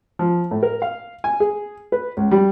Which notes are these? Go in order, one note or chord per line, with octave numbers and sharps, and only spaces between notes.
F3
A2
A#4
F5
G#5
G#4
B4
C#2
G3